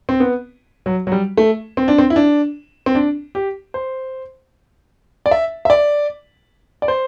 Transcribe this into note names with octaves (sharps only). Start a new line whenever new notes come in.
C4
B3
F#3
F#3
G3
A3
C4
D4
C4
E4
D4
C4
D4
G4
C5
D5
E5
E5
D5
D5
C5